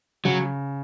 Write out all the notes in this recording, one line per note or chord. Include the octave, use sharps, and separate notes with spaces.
C#3 F#3